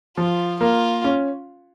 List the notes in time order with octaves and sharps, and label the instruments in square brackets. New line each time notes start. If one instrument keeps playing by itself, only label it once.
[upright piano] F3 [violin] F4
[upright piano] A#3 [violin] F4
[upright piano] C#4